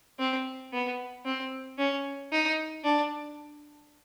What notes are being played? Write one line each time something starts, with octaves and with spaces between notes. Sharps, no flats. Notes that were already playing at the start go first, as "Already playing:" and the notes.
C4
B3
C4
C#4
D#4
D4